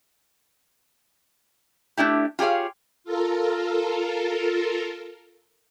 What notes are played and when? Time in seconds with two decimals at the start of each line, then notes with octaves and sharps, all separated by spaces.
1.97 A3 D4 E4 G4
2.39 F4 G4 G#4 C#5 F5
3.04 F4 A4 A#4